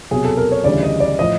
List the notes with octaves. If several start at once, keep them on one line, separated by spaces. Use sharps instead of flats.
C2 B2 F#3 G#4
A4
A#4
C#5
D2 C#3 E3 G3 D5
D#5
D5
A2 F3 D#5